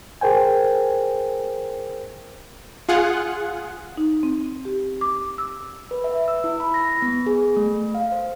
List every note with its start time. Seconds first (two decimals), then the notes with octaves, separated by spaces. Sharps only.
0.21 G#4 A#4 C5 G5 G#5
2.89 F4 G#4 F#5
3.97 D#4
4.23 C4
4.65 G4
5.01 D6
5.38 E6
5.91 B4
6.04 E5
6.28 E6
6.44 E4
6.60 B5
6.74 A#6
7.02 B3
7.26 G#4
7.57 A3
7.95 F5
8.12 C5